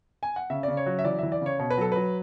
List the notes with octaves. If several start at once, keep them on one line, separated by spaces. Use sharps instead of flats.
G#5
F#5
C#3 E5
C#3 D5
C#5
F#3
E5
E3 D5
E3 E5
D5
C#3
C#5
B2 C#5
B4
F#3 A4
F#3 B4